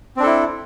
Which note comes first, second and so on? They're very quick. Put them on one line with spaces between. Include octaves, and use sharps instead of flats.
C4 D4 A4 E4